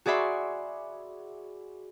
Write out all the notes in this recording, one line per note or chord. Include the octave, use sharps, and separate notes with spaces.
F#4 G#4 D5 E5 B5 C6